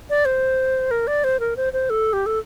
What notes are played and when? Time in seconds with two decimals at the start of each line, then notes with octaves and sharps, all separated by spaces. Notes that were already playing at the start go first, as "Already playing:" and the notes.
0.10 D5
0.25 C5
0.91 A#4
1.07 D5
1.24 C5
1.40 A#4
1.57 C5
1.73 C5
1.90 A4
2.13 G4
2.26 A4